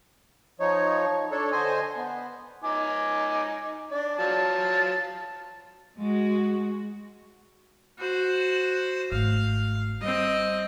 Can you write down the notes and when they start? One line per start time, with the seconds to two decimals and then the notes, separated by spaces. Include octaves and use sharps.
0.60 F3 D#4 C#5
1.31 D4 A4 C#5
1.52 D3 C5 D#5 G#5
1.96 B3
2.64 D#4 G#5 D6
3.91 D4 D5
4.19 F#3 F4 A5
5.98 G#3 F#4
7.99 F#4 C5
9.12 G#1 A3 F5
10.01 G3 C4 D#5